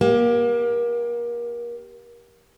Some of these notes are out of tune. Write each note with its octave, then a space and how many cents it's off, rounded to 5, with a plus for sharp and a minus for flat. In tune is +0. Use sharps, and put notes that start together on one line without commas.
A#3 +30 G4 +0